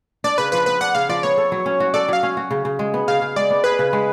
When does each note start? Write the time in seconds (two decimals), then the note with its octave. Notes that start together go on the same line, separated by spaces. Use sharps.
0.24 D4 D5
0.38 C#3 B4
0.52 F3 B4
0.66 B3 B4
0.81 D4 F#5
0.95 C#3 F5
1.09 F3 D5
1.23 B3 C#5
1.38 A4
1.52 F#3
1.66 C#4
1.80 F#4
1.94 A4 D5
2.08 F#3 F5
2.23 C#4
2.37 F#4
2.51 C#3
2.65 C#3
2.79 G#3
2.94 B3
3.08 C#3 F5
3.22 C#3
3.36 G#3 D5
3.50 B3
3.64 G#4 B4
3.79 C#3
3.93 G#3